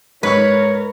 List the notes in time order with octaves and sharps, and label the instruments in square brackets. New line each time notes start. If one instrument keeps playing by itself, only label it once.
[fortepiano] G#2 B5 C#6 [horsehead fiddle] A#4 [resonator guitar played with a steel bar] B4 [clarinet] C#5